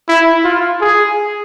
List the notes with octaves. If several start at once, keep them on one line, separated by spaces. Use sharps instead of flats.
E4
F4
G#4